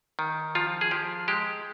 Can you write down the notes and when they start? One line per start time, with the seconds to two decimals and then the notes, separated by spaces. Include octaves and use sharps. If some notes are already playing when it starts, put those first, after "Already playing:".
0.19 D#3
0.55 F3 F4
0.81 G#4
0.91 F3 G4
1.28 G#3 G4